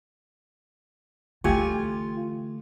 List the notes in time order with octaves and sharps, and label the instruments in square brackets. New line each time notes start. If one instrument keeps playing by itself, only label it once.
[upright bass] D3 E3 [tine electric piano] A3 [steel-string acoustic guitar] F4 [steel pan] G4 G#5 C#6